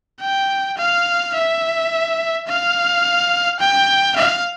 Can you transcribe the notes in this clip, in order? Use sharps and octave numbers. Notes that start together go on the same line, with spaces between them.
G5
F5
E5
F5
G5
F5